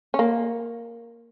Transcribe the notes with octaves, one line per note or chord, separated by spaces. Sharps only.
C#4
A#3